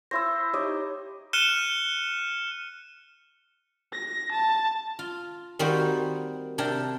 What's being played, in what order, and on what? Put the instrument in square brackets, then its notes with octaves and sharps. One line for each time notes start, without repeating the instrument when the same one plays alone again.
[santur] E4 C5 [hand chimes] E6 A#6
[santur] D#4 D#5 [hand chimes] G4 C#5 D6
[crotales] F6 F#6 C#7 D#7 E7 G7
[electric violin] A#6
A5
[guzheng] F4
D#3 G3 A#3 C4 F#4 C5
C3 D4 A#4 G5 A5